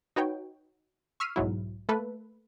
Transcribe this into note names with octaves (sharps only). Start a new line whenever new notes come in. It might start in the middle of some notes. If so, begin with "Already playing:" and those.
D#4 F#4 B4 C#5 G5
C#6 E6 F6 B6 C7 D#7
B1 G#2 F#3 E4
A3 A#3 A4 B4